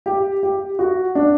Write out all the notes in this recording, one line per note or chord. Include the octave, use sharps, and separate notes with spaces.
G4
G4
F#4
D4